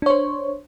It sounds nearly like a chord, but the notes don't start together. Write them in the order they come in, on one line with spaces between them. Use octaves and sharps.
D4 C#5 C5